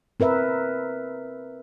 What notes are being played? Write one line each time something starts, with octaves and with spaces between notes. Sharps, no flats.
C4 A#4 B4 E5